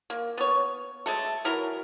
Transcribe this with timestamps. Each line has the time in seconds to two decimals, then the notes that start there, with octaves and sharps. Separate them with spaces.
0.10 A#3
0.37 B3 C#5
1.06 G#3 A3 A4
1.45 E3 F#3 E4 A#4